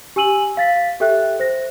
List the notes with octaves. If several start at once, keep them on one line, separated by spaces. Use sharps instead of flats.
G4 G#5 E6 D#7 F#7
F5 A6 B6
G4 A4 E5 G5 F#6
C5 A#6